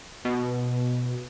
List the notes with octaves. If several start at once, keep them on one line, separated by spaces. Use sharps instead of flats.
B2